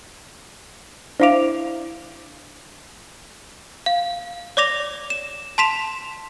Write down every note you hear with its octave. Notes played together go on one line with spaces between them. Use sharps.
D4 E4 C5 F5 D6 F7
F5
C#5 D5 D6 A#6 F7
E7
A5 C6 B6 E7 F7